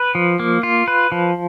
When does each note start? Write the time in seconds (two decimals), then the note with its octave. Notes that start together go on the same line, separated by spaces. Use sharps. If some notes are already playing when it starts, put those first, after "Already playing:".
Already playing: B4
0.15 F3
0.40 A#3
0.63 F4
0.88 B4
1.12 F3